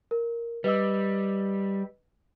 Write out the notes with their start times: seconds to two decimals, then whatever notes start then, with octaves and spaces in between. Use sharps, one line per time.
0.11 A#4
0.64 G3 B4 D#5 E6